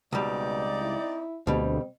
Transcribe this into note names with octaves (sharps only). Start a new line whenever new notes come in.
C#2 B2 G3 C4 D#4 D5
E4
D2 B2 G3 C4